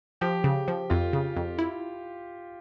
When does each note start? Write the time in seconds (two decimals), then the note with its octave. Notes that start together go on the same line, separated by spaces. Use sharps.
0.21 F3 G4
0.44 C#3
0.68 F3
0.90 F2 F4
1.13 C#3
1.36 F2
1.58 E4